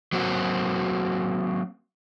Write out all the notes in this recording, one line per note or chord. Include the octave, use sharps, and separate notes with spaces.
F#3 A#3 C4 F#4